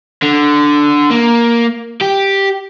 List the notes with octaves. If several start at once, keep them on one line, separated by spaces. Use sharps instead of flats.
D3
A#3
G4